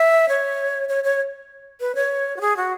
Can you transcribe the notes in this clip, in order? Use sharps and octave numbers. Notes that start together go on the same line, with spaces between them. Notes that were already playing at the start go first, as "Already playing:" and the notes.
Already playing: E5
C#5
C#5
C#5
B4
C#5
F#4
G#4
F#4